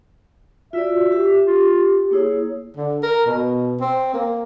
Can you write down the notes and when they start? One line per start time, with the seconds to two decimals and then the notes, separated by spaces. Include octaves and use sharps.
0.73 F4 F#4 D5 E5
1.12 G4
1.46 F4
2.11 A#3 E4 G#4 C#5
2.77 D3
3.03 A#4
3.27 B2
3.81 C4
4.14 A#3